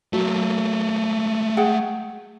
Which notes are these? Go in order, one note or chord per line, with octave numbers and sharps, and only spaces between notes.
F#3 A3 A#3
G#4 F#5 G5